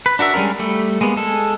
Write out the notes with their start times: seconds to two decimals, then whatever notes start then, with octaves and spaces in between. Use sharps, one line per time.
0.06 B4
0.19 D4 F#4 A#4 E5
0.34 G3 G#3 C#4 D4 A#4
0.59 G3 A3
1.01 G#3 A#3 B3
1.17 G#3 A4